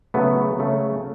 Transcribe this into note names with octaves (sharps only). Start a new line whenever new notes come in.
C#3 F#3 A3 B3
C#3 F#3 A3